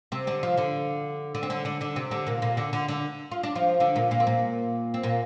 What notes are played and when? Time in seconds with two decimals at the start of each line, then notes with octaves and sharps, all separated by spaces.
0.12 C3 C4
0.27 D3 D4
0.43 F3 F4
0.57 D3 D4
1.35 D3 D4
1.43 C4
1.50 D3 D4
1.65 D3 D4
1.81 D3 D4
1.96 C3 C4
2.11 D3 D4
2.27 A#2 A#3
2.42 A#2 A#3
2.57 D3 D4
2.73 D3 D4
2.89 D3 D4
3.32 F4
3.43 D4
3.55 F3 F4
3.80 D3 D4
3.96 A#2 A#3
4.11 A#2 A#3
4.20 C4
4.27 A#2 A#3
4.94 C4
5.03 A#2 A#3